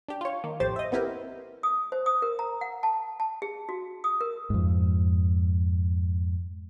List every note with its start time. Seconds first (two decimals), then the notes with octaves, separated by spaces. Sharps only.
0.08 D4 G4
0.21 F4 C#5
0.44 D#3 A#3
0.60 A#1 F2 A2 G4 C5 A6
0.76 D#5 E5
0.92 B3 C4 E4 G4 A#4
1.63 D#6
1.92 C5
2.06 D#6
2.22 A#4
2.39 A#5
2.61 F#5
2.83 A5
3.20 A5
3.42 G#4
3.69 F#4
4.04 D#6
4.21 A#4
4.50 F2 G#2